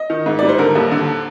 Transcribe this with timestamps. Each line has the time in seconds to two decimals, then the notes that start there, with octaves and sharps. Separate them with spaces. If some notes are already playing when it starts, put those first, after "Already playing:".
Already playing: D#5
0.10 D#3
0.26 G#2
0.39 G3 D5
0.49 C5
0.58 D3 A#4
0.75 D#2
0.91 D3